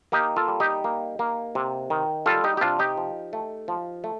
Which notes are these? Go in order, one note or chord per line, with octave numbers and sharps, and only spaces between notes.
A#3 D#4 G4
F4 A4
G3
D#4 G4
A#3
A#3
C3
D#3
G3 F4 A4
D#4 G4
G4
C3 D4 F4
D#4 G4
F3
A3
F3
A3